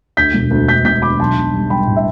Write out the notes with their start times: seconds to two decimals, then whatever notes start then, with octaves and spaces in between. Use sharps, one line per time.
0.17 D2 G6 B6
0.34 E1
0.51 D2
0.68 D2 G6 B6
0.85 E1 G6 B6
1.02 D3 B5 D6
1.20 B1 A5 C6
1.37 B1
1.54 G3
1.70 G3 G5 B5
1.87 A2
1.96 E5